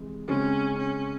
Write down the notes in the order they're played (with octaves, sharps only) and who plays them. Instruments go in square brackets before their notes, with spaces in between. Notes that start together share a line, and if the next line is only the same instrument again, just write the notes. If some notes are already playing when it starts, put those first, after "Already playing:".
Already playing: [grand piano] C3 E3 G#3
[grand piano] C#3 G#3 C4 [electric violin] C#4
[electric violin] C#4